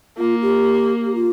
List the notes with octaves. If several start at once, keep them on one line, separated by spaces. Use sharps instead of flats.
A#3 F4
G4
G4
F4